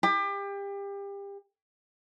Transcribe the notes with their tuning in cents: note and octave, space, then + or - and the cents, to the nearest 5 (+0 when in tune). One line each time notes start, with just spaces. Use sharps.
G4 +30